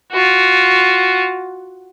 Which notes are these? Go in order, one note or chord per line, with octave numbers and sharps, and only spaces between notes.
F4 F#4